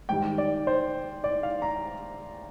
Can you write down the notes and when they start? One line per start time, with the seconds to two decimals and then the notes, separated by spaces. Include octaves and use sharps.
0.09 G#2 D#3 G3 G5
0.38 D5
0.67 C5
1.24 D5
1.43 F5
1.62 A#5